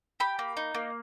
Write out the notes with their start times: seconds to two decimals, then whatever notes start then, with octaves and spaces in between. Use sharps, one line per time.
0.20 G4 B5
0.39 A#3
0.57 D#4
0.75 A#3